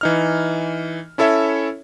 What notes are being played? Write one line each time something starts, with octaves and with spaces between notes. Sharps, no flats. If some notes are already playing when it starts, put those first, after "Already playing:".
E3 D#4 F6
C#4 E4 A4 C#5 E5